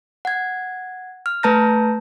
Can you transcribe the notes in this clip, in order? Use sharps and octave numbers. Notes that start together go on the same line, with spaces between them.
F#5 G#6
F6
A3 B4 A5 A#5 G6 A#6